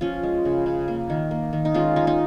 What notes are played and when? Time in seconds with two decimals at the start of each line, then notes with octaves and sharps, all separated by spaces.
0.01 F3 C#4 F4
0.23 G#3
0.45 C#3
0.66 C#3
0.88 A#3
1.10 D#3
1.31 A#3
1.53 D#3
1.65 D#4
1.74 G#3 C#4 F4
1.96 D#3 D#4
2.07 D#4